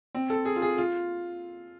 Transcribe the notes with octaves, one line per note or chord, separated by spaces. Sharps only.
C4
A4
G#4
F4
G#4
F4